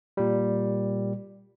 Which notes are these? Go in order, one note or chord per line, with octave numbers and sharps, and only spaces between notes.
A#2 G3